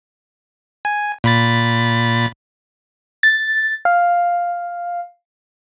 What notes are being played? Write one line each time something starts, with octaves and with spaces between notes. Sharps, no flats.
G#5
A#2 B5 A6
A6
F5